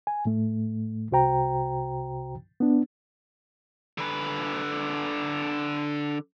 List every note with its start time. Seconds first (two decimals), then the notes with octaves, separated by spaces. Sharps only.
0.07 G#5
0.25 A2 A3
1.11 C2 C3 F#4 C5 G5 A#5
2.60 B3 D4
3.98 D3 B4